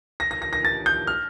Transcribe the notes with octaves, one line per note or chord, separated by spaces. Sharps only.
A#6
A#6
A#6
A#6
A6
G6
F6